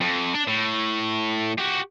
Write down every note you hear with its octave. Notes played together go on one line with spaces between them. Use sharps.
F2
D4
A2
F#4 G4